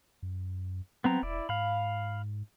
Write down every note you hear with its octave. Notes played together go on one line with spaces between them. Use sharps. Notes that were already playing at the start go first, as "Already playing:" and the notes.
F#2
F#3 B3 C4 A#5
E1 E4 D5
G#2 F5 B5